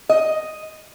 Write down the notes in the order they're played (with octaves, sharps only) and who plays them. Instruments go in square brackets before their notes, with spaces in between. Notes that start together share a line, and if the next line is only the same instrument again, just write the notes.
[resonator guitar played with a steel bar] D#5